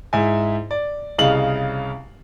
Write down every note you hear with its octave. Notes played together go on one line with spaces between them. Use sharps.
G#2 E4 E5 G#5
D5
C2 C#3 D#5 F5 F#7